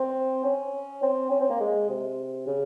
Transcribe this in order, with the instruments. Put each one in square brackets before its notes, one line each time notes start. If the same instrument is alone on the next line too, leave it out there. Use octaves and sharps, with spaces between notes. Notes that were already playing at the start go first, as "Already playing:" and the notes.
Already playing: [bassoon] C4
C#4
C4
C#4
C4
A#3
G#3
C3
C#3